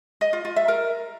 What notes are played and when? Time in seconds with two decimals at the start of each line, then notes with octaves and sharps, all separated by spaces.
0.21 D#5
0.33 F4
0.45 F4
0.56 E5
0.68 A#4